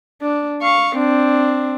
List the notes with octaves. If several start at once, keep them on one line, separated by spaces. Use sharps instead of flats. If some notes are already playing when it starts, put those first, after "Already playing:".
D4
F5 C#6
C4 D4